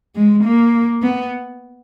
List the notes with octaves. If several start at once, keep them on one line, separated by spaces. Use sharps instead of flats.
G#3
A#3
B3